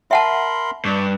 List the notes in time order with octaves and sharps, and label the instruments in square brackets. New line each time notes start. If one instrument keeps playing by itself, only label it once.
[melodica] A#4 B5 C6 [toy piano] E5 F#5 A5
[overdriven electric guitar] G2 [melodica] D5 C#6